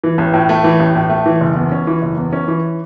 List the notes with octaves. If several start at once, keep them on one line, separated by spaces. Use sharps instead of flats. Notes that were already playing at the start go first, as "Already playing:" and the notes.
E3
A1
A2
A3
E3
A1
A2
A3
E3
F#1
E2
C#4
E3
F#1
E2
C#4
E3